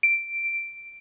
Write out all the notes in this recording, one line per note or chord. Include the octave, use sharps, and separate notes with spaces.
D7